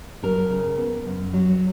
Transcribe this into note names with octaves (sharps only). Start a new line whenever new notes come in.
F#3 A#4
C#3
B3
F#2
F#3